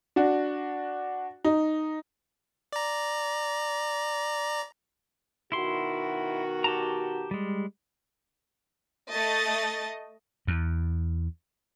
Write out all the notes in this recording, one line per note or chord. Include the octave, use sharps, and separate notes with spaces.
D4 F#4
D#4
D5 A#5
B2 D#3 E4 F#4 C6
G4 A5 A#5
G3 G#3
A3 D#5 A6
E2